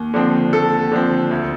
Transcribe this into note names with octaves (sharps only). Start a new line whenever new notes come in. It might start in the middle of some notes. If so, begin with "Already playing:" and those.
Already playing: D#2
D3 F3 C4
D#2 A4
D3 F3 C4
D2